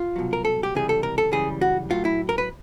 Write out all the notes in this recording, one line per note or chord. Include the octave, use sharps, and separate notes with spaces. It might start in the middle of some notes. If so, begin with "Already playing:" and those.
Already playing: F4
C2 B2 F#3
A#4
A4
G4
C#2 C3 E3 G3 G#4
A4
A#4
A4
F#2 C#3 E3 G3 G#4
F#4
A2 F#3 F4
E4
A#4
B4